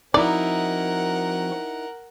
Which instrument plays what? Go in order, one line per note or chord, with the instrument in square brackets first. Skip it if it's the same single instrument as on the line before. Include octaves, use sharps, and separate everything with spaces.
[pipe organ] F3 C4 F#4 [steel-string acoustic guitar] D#4 E4 [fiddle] A#4 F#5 [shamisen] D5